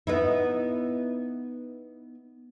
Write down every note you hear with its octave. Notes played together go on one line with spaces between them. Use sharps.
B3 D#4 E4